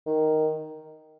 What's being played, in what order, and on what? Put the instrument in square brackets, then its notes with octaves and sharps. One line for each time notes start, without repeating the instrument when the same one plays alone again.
[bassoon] D#3